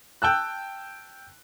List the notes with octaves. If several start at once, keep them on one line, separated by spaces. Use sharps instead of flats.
G5 A5 E6 F#6